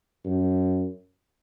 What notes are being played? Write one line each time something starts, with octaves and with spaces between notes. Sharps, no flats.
F#2